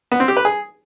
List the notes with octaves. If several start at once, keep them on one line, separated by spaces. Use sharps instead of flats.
B3
C4
G4
B4
G#4